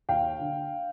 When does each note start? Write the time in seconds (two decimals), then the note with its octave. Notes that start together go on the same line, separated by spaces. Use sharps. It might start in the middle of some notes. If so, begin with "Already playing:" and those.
0.09 D#2 F5 G5
0.39 D3